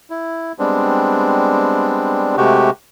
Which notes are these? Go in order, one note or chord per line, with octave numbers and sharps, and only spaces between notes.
E4
G3 G#3 B3 C4 D4
C3 G#3 A3 F#4 G4